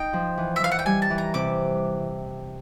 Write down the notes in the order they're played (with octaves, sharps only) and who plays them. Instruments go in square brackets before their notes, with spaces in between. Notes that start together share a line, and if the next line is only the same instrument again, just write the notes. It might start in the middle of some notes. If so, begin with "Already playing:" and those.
Already playing: [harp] D#4 [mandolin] G5
[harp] F3
E3
[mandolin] E5
[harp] E3 [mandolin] F5
[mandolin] F#5
G5
[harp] G3 [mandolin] G#5
[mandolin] A5
[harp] E3
[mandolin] A#5
[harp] C3 [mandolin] D6